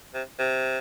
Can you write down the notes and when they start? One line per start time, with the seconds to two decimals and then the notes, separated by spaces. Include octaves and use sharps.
0.14 C3
0.39 C3